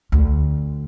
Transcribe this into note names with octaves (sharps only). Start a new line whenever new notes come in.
D2 D3